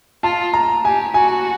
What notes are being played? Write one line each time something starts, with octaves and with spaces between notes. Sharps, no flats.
F4 A5
A#5
G4 G#5
F#4 G#5